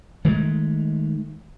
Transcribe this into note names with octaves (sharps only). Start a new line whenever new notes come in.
D#3 G#3 A3